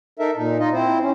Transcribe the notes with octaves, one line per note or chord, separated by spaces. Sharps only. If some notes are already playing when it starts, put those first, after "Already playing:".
D#4 A4 A#4 E5
A#2 D#4
D#4 F4 D#5
C4 E4 C5
C#4